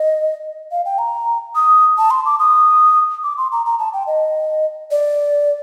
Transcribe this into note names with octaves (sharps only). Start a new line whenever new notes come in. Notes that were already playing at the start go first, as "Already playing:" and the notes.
Already playing: D#5
F5
G5
A#5
D#6
A5
C6
D6
D#6
D6
C6
A#5
A#5
A5
G5
D#5
D5